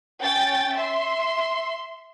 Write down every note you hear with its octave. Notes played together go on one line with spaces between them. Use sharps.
C#4 G5 A6
E5 C6